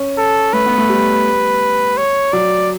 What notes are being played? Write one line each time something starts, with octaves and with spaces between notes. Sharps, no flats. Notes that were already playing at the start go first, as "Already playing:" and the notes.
Already playing: C#4
A4
A3 B4
B3
A3
G3
C#5
F#3 D5